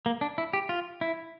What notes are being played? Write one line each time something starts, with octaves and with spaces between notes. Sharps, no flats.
A#3
D4
E4
G4
F4
E4